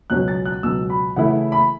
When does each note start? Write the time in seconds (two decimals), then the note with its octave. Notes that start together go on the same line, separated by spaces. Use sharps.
0.10 C#2 B2 F#3 C#4 F#6
0.28 A6
0.46 F#6
0.63 C#2 B2 F#3 C#4 E6
0.90 B5
1.16 C#3 E3 A3 E4 F#5
1.52 B5